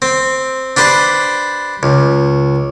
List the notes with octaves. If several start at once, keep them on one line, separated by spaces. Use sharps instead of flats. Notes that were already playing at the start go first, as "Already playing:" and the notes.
C4
D4 G4 B4 C5
C#2